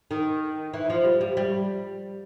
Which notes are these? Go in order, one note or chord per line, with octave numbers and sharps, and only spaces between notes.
D#3
E3
F3
G3
G3
G3